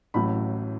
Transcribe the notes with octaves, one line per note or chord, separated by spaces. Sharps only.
A1 A2 F#3 B5